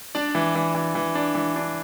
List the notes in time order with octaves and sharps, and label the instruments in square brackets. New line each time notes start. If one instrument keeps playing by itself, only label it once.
[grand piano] D4 D5
E3
E3
E3
E3
D4
E3
D4